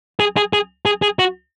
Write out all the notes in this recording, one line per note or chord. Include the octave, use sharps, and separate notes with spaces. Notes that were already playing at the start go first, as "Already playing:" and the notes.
G#4
G#4
G#4
G#4
G#4
F#4